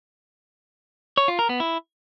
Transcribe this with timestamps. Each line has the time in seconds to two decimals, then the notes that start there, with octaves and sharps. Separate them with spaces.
1.17 C#5
1.28 F4
1.39 A#4
1.49 B3
1.60 E4